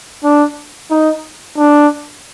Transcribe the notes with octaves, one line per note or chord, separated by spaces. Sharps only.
D4
D#4
D4